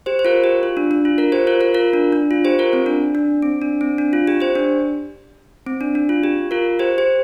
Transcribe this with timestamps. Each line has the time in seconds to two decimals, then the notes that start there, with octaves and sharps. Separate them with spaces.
0.06 G4 C5
0.19 C5
0.25 F4 A#4
0.44 G4
0.63 F4
0.77 D4
0.91 D4
1.05 F4
1.18 F4 A#4
1.32 G4 C5
1.47 F4 A#4
1.61 F4 A#4
1.75 F4 A#4
1.93 D4
2.12 D4
2.31 F4
2.45 G4 C5
2.59 F4 A#4
2.73 C4
2.86 D4
3.15 D4
3.42 C4
3.62 D4
3.81 C4
3.98 D4
4.13 F4
4.27 G4
4.40 G4 C5
4.55 D4
5.67 C4
5.81 D4
5.95 D4
6.09 F4
6.24 G4
6.51 F4 A#4
6.79 G4 C5
6.98 G4 C5